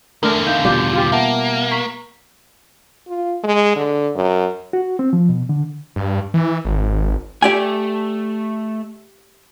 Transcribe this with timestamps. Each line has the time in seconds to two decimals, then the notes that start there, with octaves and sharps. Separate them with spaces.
0.23 E2 D3 A3 D4 A#4
0.47 D#4 F5 G6
0.65 B2 G3 F4 D6 G6
0.93 F4 G4
1.12 A#3 E5 F#5 A5
1.71 A#5 C#6 B6
3.08 F4
3.44 G#3
3.76 D3
4.15 F#2
4.73 F#4
4.99 C4
5.13 F3
5.29 B2
5.49 D3
5.96 G2
6.34 E3
6.65 G#1
7.42 A3 G4 D5 G#5